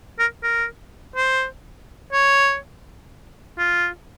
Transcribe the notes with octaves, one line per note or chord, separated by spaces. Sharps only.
A#4
A#4
C5
C#5
F4